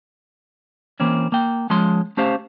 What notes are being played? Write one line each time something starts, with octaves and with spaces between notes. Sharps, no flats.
E3 A#3 C4 C#4
A#3 G5
F3 G#3 C#4 C6
A3 C#4 G4 C5 F5